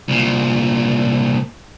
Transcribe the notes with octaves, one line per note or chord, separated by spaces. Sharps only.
C2 A#2